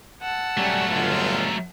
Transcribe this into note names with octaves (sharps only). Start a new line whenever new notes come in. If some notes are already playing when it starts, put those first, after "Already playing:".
F#5 A5 E6
F#3 G3 A3 C#4 G4
G1 C#2 F4